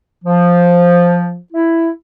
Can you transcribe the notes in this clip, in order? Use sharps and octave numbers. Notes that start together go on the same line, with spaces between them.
F3
E4